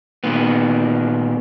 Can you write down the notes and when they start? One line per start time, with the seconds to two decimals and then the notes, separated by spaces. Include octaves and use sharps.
0.24 A#2 D#3 B3